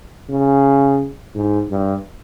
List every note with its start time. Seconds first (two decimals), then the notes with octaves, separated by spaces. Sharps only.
0.30 C#3
1.35 G#2
1.70 G2